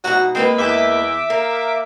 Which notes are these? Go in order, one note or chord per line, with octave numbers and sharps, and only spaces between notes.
G#2 B2 F#4
G#3 A#3 C4 B4
E2 E5 D6 B6
A#3 A#4